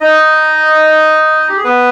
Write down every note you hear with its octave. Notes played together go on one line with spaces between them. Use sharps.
D#4 D#5
G4
G#4
B3 B4